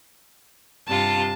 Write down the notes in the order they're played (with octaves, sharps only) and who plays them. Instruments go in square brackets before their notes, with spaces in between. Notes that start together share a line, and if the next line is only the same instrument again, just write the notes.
[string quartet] G2 C3 F4 [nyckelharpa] A5